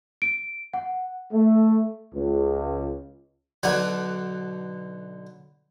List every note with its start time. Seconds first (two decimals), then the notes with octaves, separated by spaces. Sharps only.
0.22 D7
0.74 F#5
1.32 A3
2.13 C#2
3.63 B1 D3 D5 F#5 G#5